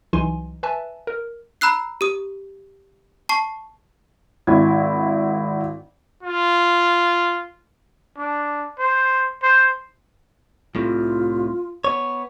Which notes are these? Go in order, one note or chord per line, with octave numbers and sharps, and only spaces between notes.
C2 E3 F#3 D#4 G#5 C6
B4 E5 G#5 A5
A#4
A#5 B5 E6 F#6 C7
G4 D#6
A5 C#6 C7
G#1 E4 G#6
F4
D4
C5
C5
C2 A2 C3 F4
B3 C#5